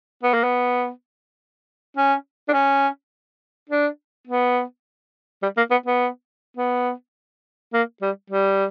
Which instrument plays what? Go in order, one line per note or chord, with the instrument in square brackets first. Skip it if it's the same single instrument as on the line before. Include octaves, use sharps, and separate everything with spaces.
[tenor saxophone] B3
A#3
B3
C#4
D4
C#4
D4
B3
G3
A#3
B3
B3
B3
A#3
G3
G3